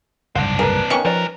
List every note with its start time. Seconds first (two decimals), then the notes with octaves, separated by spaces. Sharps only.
0.35 F#1 C2 G#2 C4 D4 F#5
0.59 G#4 A#4 B4
0.90 D#3 B3 C#4 C#6
1.05 F3 G3 A#4 B4 D5